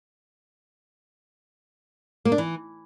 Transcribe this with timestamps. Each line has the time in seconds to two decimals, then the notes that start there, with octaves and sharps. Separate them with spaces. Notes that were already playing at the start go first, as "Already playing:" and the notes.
2.25 A#3
2.32 D4
2.38 E3